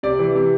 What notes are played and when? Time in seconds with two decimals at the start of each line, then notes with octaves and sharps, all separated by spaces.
0.03 C3 D5
0.19 E3
0.35 C3